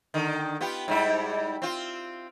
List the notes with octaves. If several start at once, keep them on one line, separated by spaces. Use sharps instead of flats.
D3 D#3
B3 F4 G4
G#2 G3 E4
C4 F4